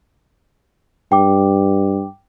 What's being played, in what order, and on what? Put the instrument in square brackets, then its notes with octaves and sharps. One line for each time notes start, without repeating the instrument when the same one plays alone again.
[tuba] G2 [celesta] G5 D6